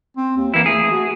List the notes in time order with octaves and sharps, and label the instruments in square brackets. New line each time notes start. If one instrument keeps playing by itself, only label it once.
[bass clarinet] C4
D#2
[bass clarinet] E3 [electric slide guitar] A#3 E4
[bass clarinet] A3 [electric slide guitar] G#4
[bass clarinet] F#4